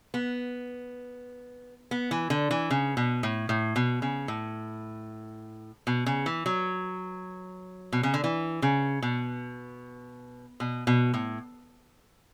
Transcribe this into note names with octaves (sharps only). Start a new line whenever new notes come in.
B3
B3
E3
D3
E3
C#3
B2
A2
A2
B2
C#3
A2
B2
C#3
E3
F#3
B2
C#3
D3
E3
C#3
B2
B2
B2
A2